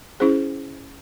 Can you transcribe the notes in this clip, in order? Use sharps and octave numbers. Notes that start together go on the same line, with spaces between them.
C#4 E4 G#4 C5